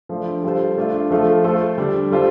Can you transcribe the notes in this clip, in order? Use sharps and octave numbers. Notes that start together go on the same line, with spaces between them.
F3 A3 D4 F4
G3 F4 A4 C5
A3 D4 F4
F3 A3 F4 A4
A3 F4 A4 C5
D3 G3 D4
G3 F4 A4 C5